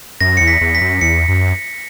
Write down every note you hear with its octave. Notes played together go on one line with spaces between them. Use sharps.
F#2 A#6
E2 C#7
B6
E2
B6
F#2
E2 C#7
F#2